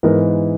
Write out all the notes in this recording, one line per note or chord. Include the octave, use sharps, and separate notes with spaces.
G#2 E3 G#3 B3 D#4 A#4